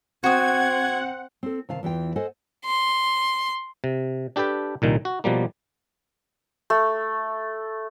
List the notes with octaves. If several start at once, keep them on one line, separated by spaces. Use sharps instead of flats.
C4 F#4 F#5 D#6 G#6
C4 A4
C3 D#3 F5 A5
E2 E3 F4 G5
A4 C5 D#5 F#5 G#5
C6
C3
D4 G4 A4 B4 G5
C2 A#2 D#3
F#4
B2 F3 G3 A#3
A3